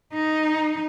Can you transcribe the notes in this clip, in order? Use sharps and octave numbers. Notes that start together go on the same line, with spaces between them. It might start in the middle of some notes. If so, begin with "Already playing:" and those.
D#4